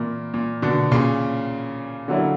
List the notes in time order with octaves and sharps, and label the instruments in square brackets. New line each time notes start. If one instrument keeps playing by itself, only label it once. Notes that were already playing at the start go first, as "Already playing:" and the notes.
Already playing: [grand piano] A#2 [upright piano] E3 A#3 E4
[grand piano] A#2
B2 D3
A#2 C#3
[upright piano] D3 F#3 A#3 E4